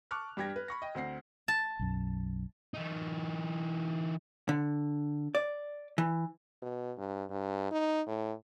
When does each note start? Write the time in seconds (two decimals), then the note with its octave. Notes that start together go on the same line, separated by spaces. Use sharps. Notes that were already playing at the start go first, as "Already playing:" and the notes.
0.11 A5 C#6 D6 F6 F#6
0.37 G2 G3 G4 G5 G#6 A#6
0.56 B4
0.68 B5 C#6 A#6
0.82 D#5 G5
0.95 D2 C4 F#5 C7
1.48 A5
1.79 B1 F#2
2.74 E3 D#4
4.49 D3
5.35 D5
5.98 E3
6.62 B2
6.98 G2
7.30 G2
7.72 D#4
8.07 A2